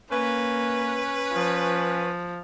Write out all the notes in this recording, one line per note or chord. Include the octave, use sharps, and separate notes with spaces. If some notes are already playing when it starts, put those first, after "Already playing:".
A#3 C#4 B4
F3